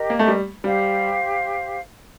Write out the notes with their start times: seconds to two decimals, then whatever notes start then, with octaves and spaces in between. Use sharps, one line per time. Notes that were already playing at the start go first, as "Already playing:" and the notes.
Already playing: G4 A#4 D#5
0.10 A#3
0.19 A3
0.28 G3
0.64 G3 G4 C5 F5